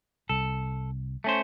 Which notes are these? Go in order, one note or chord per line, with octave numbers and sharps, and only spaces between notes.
C2 A4
A3 C#4 C5